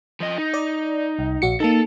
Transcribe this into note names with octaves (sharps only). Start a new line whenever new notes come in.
F3 D#5
D#4
D5
C2
A#1 F#4 C#7
A#3 D#4 A4 A5